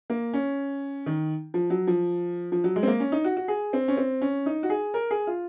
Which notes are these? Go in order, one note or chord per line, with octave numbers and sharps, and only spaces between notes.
A#3
C#4
D#3
F3
F#3
F3
F3
F#3
G#3
C4
A#3
C#4
D#4
F#4
F#4
G#4
C4
C#4
C4
C#4
D#4
F#4
G#4
A#4
G#4
F4